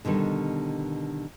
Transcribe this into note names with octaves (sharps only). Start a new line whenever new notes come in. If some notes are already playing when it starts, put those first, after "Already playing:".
B2 D3 D#3 G3